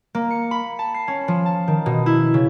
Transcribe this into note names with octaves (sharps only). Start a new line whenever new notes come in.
A#3
C#7
B5
A5
C7
C#4
F3
A5
D#3
B2
E4
C#3